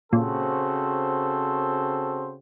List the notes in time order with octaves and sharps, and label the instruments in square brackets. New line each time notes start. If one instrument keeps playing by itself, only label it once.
[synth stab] A#2 [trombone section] C#3 C4 F#4 [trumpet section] A4 C5